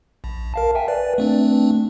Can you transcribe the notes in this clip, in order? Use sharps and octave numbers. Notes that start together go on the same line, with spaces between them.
A#1
A#4 F5 A5
E5 G5 G#5
B4 D5
A3 C4 D4